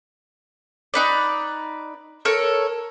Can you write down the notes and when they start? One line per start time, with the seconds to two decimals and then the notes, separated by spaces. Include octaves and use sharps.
0.94 D#4 B4 D5
2.25 A4 A#4 C#5